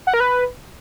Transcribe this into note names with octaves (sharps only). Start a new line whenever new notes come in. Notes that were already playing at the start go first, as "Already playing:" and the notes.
F#5
A#4
B4